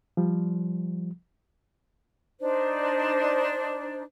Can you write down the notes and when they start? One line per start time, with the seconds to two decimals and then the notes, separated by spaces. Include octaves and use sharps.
0.17 F3 G3
2.39 D4 D#4 C5